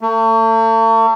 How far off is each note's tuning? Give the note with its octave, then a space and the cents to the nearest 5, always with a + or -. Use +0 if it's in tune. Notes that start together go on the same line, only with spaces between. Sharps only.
A3 +40